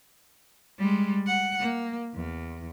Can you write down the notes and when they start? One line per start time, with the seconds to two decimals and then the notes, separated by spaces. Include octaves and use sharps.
0.79 G3 G#3
1.27 F#5
1.60 A#3
2.14 E2